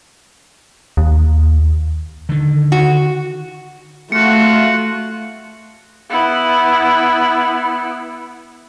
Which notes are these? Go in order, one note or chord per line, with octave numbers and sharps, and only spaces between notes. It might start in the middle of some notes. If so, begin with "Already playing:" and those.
D#2
D3 D#3
F#4
A3 F4 F#4 C#7
B3 E4